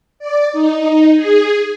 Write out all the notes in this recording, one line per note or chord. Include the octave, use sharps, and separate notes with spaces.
D5
D#4
G#4